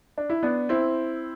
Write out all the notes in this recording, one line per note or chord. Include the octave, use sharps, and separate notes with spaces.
D4
E4
B3 D4
C4 E4